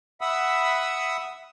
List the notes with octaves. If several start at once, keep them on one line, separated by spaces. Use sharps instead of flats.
E5 F#5 B5 D#6 E6